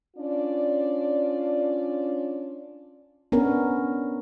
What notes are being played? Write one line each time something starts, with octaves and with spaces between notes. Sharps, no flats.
C#4 D4 F4 D5
B3 C#4 D4 A#4